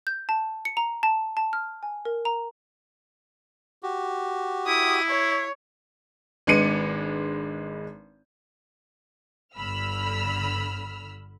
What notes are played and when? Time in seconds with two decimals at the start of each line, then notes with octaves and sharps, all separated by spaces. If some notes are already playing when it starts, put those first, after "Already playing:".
0.07 G6
0.29 A5
0.65 C#7
0.77 A#5
1.03 A5
1.37 A5
1.53 F6
1.83 G#5
2.05 A#4
2.25 A#5
3.83 F#4 G4
4.67 E4 D#6
5.11 C#5
6.47 G#1 G#3 D4 B4 C#7 D#7
9.56 G1 D3 B5 E6 F6